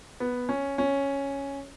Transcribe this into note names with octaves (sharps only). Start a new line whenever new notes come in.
B3
C#4
C#4